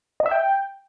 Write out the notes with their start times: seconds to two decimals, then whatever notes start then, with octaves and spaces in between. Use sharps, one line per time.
0.20 D#5
0.26 E5
0.31 G5